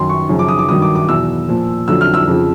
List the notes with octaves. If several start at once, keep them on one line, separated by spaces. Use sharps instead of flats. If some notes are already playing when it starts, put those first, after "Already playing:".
Already playing: F#2 D#3 F#3 C6
C#6
F#2 C#3 F3
D6
D#6
D6
G2 D#3 F#3 D#6
D6
D6
E2 B2 F#3 E6
A#2 F3
F2 D3 F#3 E6
F6
E6
F2 C#3 F3